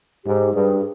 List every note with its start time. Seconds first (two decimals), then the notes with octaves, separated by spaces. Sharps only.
0.25 G#2 G4
0.54 G2 G#4
0.79 G#4